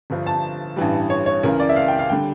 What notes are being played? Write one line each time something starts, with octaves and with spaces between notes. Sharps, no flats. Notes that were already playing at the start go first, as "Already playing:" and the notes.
G1 G2 F3
A5
A1 G2 E3 G3
C#5
C#5
C#2 C#3 E3 A#4
D5
E5
F5
G5
F5
D3 G3 G5